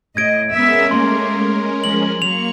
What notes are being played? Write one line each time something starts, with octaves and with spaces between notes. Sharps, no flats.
A2 D#5 G#6 D7
G#3 B3 C#4 A#4 E5
A3 A#3 C6
F3 F#7
F#3 A#3 C#6 C#7 F7